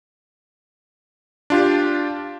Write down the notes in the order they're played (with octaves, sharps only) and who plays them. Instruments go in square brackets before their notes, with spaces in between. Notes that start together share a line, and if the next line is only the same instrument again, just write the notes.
[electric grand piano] D4 F4 G4